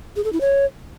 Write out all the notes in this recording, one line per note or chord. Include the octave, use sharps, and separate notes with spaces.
G#4
A4
E4
C#5